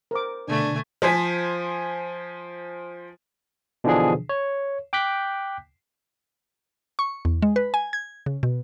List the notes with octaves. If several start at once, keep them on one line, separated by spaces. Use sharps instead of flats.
A#4 C5 D6
B2 D3 A3 D4 G#5
F3 C5 G#5 B6
B2 D3 E3 F3 D4 G#4
C#5
G5 D6 F#6 G6 B6
C#6
E2
G#3
B4
G#5
G#6
C#3
B2